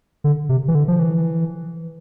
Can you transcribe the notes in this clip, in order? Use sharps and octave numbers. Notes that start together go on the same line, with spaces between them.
D3
C3
E3
D3
F3
E3